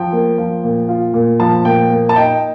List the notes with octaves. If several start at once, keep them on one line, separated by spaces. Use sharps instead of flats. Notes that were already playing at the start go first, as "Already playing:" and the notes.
Already playing: F3 G5
A#3
F3
A#2
F4
A#2
F3 A5
A#2 G5
A#3
A5
D#4 G5